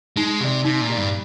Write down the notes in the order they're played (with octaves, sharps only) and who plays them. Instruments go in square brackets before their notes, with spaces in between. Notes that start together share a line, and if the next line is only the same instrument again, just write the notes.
[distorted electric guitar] G#3 [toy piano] D#4
[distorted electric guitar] C3 [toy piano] G4 D5
[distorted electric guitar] C3 [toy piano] D#4
[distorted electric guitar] A#2
[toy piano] G4 D5
[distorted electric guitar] G2